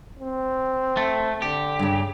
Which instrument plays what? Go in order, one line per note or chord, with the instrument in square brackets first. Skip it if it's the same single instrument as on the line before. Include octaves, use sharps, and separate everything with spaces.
[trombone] C4
[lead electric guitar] A3
[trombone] D3 [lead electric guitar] G4
[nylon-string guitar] G2 C#3